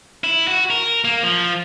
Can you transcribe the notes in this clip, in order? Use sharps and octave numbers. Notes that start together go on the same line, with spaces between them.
E4
F#4
A#4
A#3
F3